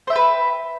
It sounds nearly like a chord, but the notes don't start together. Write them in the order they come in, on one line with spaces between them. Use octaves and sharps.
C5 E5 G5 B4